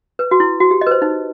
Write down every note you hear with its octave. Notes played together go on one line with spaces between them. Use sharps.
B4
F#4
E4
F#4
G4
D#5
B4
C5
D#4